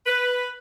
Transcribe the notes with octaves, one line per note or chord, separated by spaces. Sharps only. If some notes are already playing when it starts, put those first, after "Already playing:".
B4